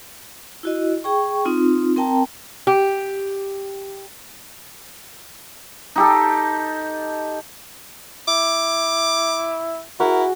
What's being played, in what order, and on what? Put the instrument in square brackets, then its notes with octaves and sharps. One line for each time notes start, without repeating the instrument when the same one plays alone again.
[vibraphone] E4 F#4 D#5
G#4 G5 C#6
C4 D#4 F4
C4 A#4 G5 A5 A#5
[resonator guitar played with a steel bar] G4
[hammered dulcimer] D#4 G4 A4
[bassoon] E4 [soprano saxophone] D6
[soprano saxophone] E4 [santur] F#4 G#4 [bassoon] A#4